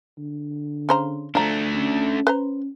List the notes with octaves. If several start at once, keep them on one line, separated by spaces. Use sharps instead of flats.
D3
C#3 C5 A#5
F3 A3 D4 A#5
C#4
B4 C5 A#5